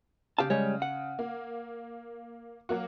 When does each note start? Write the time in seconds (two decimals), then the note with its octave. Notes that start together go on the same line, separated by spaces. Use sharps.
0.38 C#3 G4 F5 A5
0.50 G3 G#3 C#5
0.82 F#5
1.19 A#3
2.69 F#3 A#3 F#4